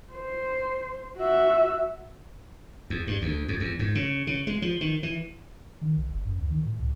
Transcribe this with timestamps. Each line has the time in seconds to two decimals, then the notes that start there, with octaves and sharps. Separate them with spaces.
0.12 C5
1.17 F#4 E5
2.90 E2
3.07 G2
3.22 D2
3.48 F2
3.60 E2
3.79 G#2
3.95 C#3
4.27 C#3
4.47 G#3
4.62 F3
4.81 D#3
5.03 E3
5.81 D#3
5.97 B1
6.10 F#1
6.25 F#2
6.39 D2
6.50 D#3
6.65 A2
6.80 C#2